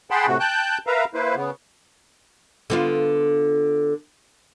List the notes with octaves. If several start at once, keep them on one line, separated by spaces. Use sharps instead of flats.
G#4 F#5 G5 A5 B5 C6
A2 C3 F#4
G5 A5 F#6 G6
A#4 B4 E5 F5 A#5
A#3 E4 B4 C5
C#3 B3
D3 B3 F4